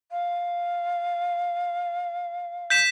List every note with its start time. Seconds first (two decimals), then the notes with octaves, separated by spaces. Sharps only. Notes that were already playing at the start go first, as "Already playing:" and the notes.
0.11 F5
2.70 G6 B6 E7